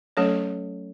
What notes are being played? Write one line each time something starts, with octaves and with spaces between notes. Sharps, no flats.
F#3 A3 C#4 A4 C#5